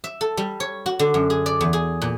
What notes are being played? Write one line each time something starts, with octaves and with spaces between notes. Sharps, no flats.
E5
A4
G3
C#5
F#4
D3
F#2
G#4
D5
E2
G#4
A#2